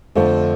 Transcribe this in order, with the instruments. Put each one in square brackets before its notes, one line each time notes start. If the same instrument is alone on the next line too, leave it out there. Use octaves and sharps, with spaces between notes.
[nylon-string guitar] F2 D3 F3 A3